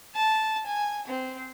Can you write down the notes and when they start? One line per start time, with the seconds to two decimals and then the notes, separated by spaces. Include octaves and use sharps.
0.15 A5
0.66 G#5
1.08 C4